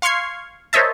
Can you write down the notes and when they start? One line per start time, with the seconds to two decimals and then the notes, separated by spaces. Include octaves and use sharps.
0.02 F5 C6 C#6 F6 G#6 C7
0.73 A#4 C5 C#5 D#5 E5 A5